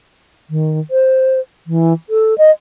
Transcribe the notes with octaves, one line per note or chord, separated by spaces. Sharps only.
D#3
C5
E3
A4
D#5